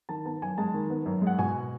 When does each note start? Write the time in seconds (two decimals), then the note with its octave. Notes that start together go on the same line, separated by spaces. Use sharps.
0.09 D#3 A5
0.25 B3 A5
0.42 F#2 G#5
0.58 G#3 A5
0.74 D#3
0.90 B3
1.06 F#2
1.22 G#3
1.27 F#5
1.39 B2 G#5